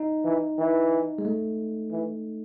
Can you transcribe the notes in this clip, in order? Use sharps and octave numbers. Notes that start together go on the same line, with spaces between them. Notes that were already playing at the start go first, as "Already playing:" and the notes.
Already playing: D#4
E3
E3
G#3
A3
E3